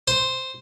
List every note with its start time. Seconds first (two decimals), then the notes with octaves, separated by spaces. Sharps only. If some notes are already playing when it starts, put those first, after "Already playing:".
0.08 C5